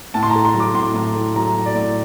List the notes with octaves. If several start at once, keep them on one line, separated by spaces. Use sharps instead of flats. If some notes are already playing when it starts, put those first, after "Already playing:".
A2 A5
C6
A#5
A3
C6
F#3
D6
A2 C6
A2
A3
F#3 A#5
A2
D5
A2